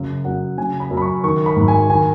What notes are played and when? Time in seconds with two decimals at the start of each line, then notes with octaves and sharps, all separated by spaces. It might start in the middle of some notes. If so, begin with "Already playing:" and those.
Already playing: F#2 C#3
0.25 F#2 F#5
0.58 C#3 G#5
0.80 B5
0.91 F#2
0.97 B5
1.02 C#6
1.24 D#3 C#6
1.46 B5
1.56 G#2
1.68 G#5
1.90 D#3 G#5